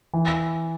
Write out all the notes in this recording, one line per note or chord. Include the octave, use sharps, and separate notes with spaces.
E3